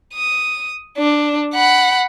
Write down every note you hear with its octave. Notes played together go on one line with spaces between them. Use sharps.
D#6
D4
F#5 B5